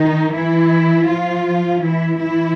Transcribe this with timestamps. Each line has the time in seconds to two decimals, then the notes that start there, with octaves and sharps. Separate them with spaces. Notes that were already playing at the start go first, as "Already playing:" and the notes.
Already playing: D#3 D#4
0.33 E3 E4
1.08 F3 F4
1.83 E3 E4
2.20 E3 E4